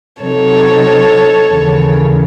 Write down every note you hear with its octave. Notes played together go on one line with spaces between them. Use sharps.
C3 F#3 C4 D#4 A4 C#5
D#2 C#3 E3